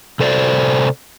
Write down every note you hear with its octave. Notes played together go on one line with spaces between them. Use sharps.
C3 A4 C5 D5